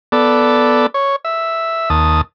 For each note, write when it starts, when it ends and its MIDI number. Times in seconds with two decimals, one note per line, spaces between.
0.12 0.86 59
0.12 0.86 69
0.12 0.86 74
0.94 1.16 73
1.25 1.89 76
1.90 2.21 39
1.90 2.21 81
1.90 2.21 87